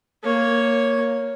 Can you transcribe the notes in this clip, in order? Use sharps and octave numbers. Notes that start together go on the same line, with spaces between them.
A#3 C#5